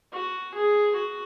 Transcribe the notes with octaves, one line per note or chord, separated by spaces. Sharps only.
F#4
G#4
F#4